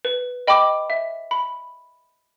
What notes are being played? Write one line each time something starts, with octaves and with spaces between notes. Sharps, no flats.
B4
D#5 G5 B5 D6
E5
B5